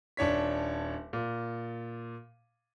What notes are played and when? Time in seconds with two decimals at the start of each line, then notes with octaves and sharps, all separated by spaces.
0.17 D#1 D4 C#5 B6
1.13 A#2